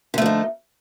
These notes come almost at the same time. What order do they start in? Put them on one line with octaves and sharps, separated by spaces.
D3 A3 F3 D#4